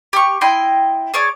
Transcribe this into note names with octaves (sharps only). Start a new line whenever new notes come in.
G4 C#6
E4 D#5 G5 C6
G#4 C#5 D5